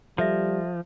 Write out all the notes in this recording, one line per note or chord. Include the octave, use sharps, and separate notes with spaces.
F3 G3 A4 E5 A#6